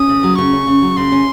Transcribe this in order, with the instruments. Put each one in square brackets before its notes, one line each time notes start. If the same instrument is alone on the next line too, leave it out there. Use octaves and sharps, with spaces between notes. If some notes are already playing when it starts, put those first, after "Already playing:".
Already playing: [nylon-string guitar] C#4 [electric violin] D#6
[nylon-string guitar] C#3
F#3
[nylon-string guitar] C#3 [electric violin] C#6
[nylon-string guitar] C#4
C#3
F#3
[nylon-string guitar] C#3 [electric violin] C6
[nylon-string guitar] C#4